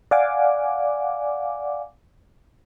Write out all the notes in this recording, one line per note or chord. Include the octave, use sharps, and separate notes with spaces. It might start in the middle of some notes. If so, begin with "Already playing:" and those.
D5 F5 F#5 G#5 D6